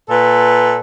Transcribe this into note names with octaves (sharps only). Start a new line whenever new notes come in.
A#2 A4 B4